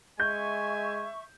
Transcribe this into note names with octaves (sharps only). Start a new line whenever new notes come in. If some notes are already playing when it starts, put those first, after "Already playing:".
G#3 E5 G#5 C#6 G6